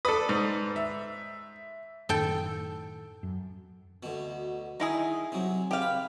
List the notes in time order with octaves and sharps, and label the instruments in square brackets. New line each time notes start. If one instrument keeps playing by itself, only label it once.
[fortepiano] A4 D#6 [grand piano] B4 D5
[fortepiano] G#2
[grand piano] E5
[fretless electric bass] F#2 A2 D#3 [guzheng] A4 G5
[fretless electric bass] F#2
[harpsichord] D2 B2
[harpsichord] D#3 [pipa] D#4 E4 G#4
[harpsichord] C3 F#3
[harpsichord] C#3 C4 [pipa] G4 F5
[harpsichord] B5